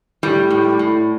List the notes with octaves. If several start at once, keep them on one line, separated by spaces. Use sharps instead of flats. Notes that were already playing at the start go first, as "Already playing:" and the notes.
A2 G3
A2
A2